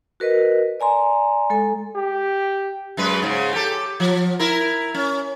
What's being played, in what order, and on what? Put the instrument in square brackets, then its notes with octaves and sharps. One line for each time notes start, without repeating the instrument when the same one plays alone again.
[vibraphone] F#4 A#4 B4 D#5
D5 G#5 A#5 C6
G#3 A4 G#5
[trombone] G4
[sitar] F#2 G#3 B4
G#2 C#3
G4 A4
F3
E4 A#4
C#4